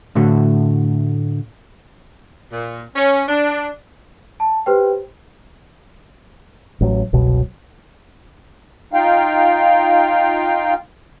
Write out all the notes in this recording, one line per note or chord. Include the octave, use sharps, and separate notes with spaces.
A2 D3 A3 F#4
A#2
C#4
D4
A5
G4 B4 C5 G5
A1 F#3
F#1 C2 B2 F#3
D#4 F4 F5 G5